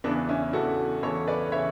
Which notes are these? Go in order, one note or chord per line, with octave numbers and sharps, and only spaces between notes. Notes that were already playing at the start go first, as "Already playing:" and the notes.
E2 C#3 E3 B3 D4
C#4 E4
E2 C#3 E3 F#4 A4
E2 C#3 E3 A4 C#5
B4 D5
C#3 E3 C#5 E5